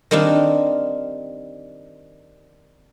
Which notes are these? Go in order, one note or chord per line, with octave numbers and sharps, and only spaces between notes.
D#3 G3 C4 D4 D#4 F4